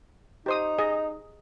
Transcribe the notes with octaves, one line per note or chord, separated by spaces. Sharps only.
D#4 G4 C5 D#6
G#4 D#5